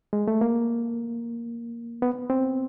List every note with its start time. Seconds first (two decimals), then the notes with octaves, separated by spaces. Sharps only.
0.13 G#3
0.28 A3
0.41 A#3
2.02 B3
2.30 C4